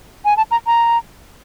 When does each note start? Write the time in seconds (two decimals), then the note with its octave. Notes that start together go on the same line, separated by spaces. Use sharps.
0.25 G#5
0.37 A5
0.51 A#5
0.67 A#5